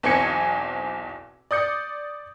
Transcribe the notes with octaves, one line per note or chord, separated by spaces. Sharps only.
B1 E2 C4 G#5 G#6 C#7
D5 D#6 G6 C#7